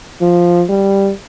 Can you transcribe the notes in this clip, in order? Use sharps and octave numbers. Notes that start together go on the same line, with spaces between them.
F3
G3